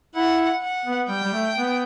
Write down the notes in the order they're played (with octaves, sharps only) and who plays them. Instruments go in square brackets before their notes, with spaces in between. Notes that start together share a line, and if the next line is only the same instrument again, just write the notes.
[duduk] E4 [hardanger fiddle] F#5
[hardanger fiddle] F#5
[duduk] B3
[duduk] G3 [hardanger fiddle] G5
[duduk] G3
A3
B3